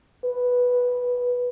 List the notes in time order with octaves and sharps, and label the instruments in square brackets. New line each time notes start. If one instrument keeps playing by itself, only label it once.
[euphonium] B4